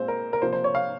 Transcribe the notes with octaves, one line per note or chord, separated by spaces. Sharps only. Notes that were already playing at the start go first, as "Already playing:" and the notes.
Already playing: A#2 G#3 C4 C5
A#4
A#4
C3 F3 A#3 C5
C5
C#5
F5